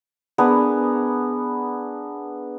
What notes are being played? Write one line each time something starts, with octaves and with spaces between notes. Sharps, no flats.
B3 D4 G#4 A#4